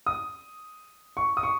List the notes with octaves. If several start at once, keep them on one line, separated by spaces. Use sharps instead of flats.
D#6
C#6
D#6
C#6